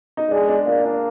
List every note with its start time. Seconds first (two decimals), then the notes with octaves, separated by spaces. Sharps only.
0.17 D#4
0.31 G#3 D4
0.49 D4
0.67 A#3 D4
0.85 D4